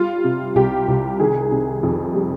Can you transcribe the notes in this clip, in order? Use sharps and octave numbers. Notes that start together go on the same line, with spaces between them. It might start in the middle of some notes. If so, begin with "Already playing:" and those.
Already playing: G3 F4
C3
C2 G4
C2
D#3 G#4
C3
F2
G3